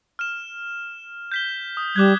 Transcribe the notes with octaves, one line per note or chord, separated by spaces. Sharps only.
F6 E7
G6 B6 G7
D#6
G3 D6 F#6 G#6